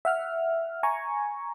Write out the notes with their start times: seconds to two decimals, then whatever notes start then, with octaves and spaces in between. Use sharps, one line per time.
0.05 E5 F#5 F6
0.83 G#5 A#5 C#6